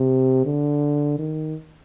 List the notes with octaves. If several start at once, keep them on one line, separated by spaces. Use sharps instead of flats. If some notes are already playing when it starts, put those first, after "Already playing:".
Already playing: C3
D3
D#3